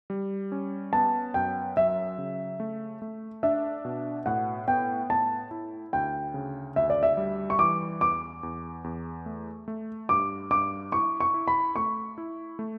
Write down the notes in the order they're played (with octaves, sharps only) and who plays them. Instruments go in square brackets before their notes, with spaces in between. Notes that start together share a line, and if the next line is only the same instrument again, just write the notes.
[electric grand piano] G3
C#4
[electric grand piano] B3 [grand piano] A5
[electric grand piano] F#2 [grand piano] G5
[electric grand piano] F#3 [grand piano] E5
[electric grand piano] C#3
A3
A3
[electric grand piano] D4 [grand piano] E5
[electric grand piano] B2
[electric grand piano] A2 [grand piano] F#5
[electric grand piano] B3 [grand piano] G5
[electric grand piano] A2 [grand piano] A5
[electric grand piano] E4
[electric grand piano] D2 [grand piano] G5
[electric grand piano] C#3
[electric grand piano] D2 [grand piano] E5
[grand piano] D5
E5
[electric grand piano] G3
[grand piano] C#6
[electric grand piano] E3 [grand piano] D6
[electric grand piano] E2 [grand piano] D6
[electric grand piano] E2
E2
A3
A3
[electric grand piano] G2 [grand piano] D6
[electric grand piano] G2 [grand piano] D6
[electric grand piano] E4 [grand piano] C#6
[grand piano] C#6
[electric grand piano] E4
[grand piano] B5
[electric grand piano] A3 [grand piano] C#6
[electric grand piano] E4
A3